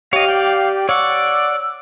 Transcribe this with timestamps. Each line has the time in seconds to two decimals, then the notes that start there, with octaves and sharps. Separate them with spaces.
0.13 G4 C#5 D#5 F5
0.28 D5 G5
0.89 C#5 D5 F#5 C#6 E6